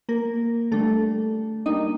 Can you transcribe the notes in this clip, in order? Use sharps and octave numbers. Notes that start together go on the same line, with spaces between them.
A#3 A#4
D3 G3 A3 D4 A4
G3 A#3 D4 D#4 D#5